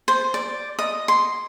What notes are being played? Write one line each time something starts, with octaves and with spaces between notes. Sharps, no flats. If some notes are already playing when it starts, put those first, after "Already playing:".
C5
D5
D#5
C6